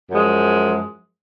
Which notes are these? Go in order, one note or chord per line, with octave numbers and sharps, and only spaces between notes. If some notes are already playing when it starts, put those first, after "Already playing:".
F#2 F3 G#3